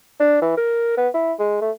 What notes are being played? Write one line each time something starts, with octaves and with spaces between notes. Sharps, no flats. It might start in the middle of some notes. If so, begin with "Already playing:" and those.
D4
E3
A#4
B3
E4
G#3
A3